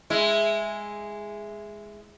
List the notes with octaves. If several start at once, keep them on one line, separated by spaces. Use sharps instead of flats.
G#3 E4